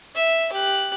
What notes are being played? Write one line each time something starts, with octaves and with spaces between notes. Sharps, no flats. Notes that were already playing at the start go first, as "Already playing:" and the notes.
E5
G4 F#6